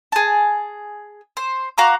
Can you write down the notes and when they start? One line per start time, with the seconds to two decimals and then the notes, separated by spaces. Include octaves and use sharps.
0.12 G#4 A5
1.37 C5
1.78 F#4 F5 A#5 D6